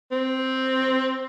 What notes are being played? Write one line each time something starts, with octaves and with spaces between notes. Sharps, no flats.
C4